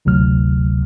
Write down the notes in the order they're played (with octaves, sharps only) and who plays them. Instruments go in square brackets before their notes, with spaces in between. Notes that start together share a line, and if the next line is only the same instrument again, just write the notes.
[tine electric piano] G1 D2 C3 F#3 F6